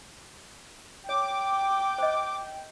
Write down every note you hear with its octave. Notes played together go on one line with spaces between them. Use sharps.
C#5 G5 D6
C5 D#5